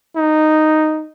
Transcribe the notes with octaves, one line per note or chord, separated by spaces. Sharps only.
D#4